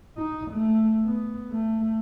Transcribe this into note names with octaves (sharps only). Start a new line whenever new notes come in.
D#4
A3
B3
A3